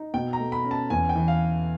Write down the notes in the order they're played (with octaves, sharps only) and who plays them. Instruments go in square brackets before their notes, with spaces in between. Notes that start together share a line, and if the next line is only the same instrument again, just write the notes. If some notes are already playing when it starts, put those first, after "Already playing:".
Already playing: [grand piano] D#4
B2 G5
A#5
A3
B5
C#4
A5
E2 G#5
G5
E3
F5